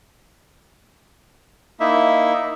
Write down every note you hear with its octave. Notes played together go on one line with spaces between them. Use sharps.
A#3 D#4 E4 E5